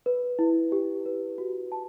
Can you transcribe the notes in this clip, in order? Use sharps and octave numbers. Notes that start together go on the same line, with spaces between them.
B4
E4
G4
B4
F#4
A5